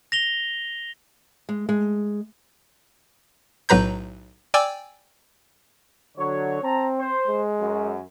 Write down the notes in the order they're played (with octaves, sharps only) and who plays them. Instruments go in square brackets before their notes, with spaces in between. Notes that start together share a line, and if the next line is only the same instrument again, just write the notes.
[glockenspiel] A#6 F7 G7
[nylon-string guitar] G#3
G#3
[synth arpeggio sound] B1 A2 F#3 B4 A#5 G6
D5 G5 G#5 D6 E6
[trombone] D3 [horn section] F#3 C#5
[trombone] C4 [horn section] A5 A#5
[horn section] C5
[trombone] G#3
[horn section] F#2